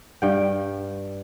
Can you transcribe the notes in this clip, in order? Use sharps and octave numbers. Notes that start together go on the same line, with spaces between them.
G2 G5